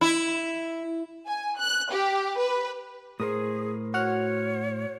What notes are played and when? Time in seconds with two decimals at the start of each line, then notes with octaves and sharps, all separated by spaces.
0.01 E4
1.27 G#5
1.59 F#6
1.91 G4
2.39 B4
3.20 A2 G#4 A#4 C5 D#6
3.94 F#4 C#5 F#5 F6